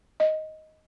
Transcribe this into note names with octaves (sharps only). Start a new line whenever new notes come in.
D#5